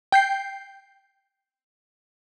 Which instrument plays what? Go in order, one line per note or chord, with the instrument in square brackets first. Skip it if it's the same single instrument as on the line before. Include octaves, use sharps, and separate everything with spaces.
[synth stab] G5 G6 C7